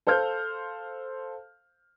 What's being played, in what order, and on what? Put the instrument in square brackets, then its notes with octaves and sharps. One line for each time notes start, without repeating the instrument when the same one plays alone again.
[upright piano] A4 C5 F5 F6 G6